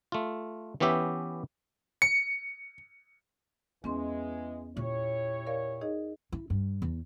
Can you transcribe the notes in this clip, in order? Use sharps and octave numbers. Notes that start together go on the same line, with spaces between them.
A3 F4
E3 B3 C#4 G4 E5
C#7
E2 E3 G#3 B3 C#4 C6
A#2 E4 G4 C#5
A#4 D5 F5
D#4 G#4 D#5
E4
G2
E2